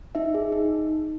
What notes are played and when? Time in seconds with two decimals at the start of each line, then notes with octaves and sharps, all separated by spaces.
0.15 D#4 E5
0.34 G#4
0.52 D#4